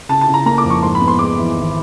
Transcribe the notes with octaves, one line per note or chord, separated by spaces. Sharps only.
C#3 A5
A5
C#3
A#5
A#3 A#5
D6
F2
C#6
G#2 C6
B5
B3
C6
G#3 D6
E3
G#1